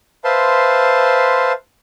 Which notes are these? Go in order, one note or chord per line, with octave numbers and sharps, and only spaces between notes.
B4 C5 E5 F5 A5 C6